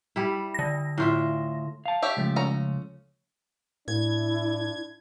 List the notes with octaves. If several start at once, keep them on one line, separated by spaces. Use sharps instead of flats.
G3 E4
D3 A#6
A2 F4 E5
F5 A5
G4 C#5 E5
C#2 F3 A3
C#4 A#5
A2 D4 E4 G#6